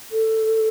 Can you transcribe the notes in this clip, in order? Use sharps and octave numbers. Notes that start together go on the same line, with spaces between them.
A4